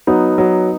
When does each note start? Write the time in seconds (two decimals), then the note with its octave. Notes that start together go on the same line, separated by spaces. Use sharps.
0.07 F#3 B3 D#4
0.38 F#3